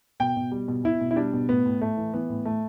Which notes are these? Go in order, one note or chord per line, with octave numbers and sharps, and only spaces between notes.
B2 G5
B2
G3
B2
B2 E4
B2
E4
G3 D4
B2
A2 B3
A2
A2 A3
E3
E3 B3
A2
A2 A3